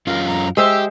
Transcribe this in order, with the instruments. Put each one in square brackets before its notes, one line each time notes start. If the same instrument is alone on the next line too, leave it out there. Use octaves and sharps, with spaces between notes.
[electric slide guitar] F#2 C#4 F4 [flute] A#4
[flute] A#5
[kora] G#3 C5 E5 [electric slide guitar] G4 [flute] E6